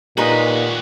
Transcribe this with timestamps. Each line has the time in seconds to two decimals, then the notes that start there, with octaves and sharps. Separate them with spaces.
0.17 D#2 A#2 G#3 D#4 F#4 G4 B4 A#5